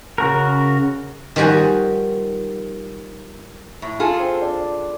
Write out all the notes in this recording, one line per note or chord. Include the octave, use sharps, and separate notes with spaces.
C#3 F#4 A#4
D#3 F3 G3 F#4 G#5
A2
F4 G#4 A4
C4
D4